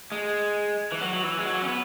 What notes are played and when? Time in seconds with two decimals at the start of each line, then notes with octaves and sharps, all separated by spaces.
0.12 G#3
0.92 E3
1.01 F#3
1.13 F#3
1.23 E3
1.38 G#3
1.46 F#3
1.63 C#4
1.68 B3